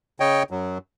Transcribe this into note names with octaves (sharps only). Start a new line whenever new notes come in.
C#3 C#5 D#5 G5
F#2 F#3